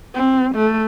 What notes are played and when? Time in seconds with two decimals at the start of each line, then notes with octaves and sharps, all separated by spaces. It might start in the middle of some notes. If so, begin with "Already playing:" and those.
0.14 C4
0.55 A3